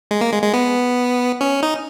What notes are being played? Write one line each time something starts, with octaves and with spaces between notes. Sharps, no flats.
G#3
A#3
G#3
G#3
B3
C#4
D#4